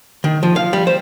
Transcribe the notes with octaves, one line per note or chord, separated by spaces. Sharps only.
D#3
F3
F5
G3
C5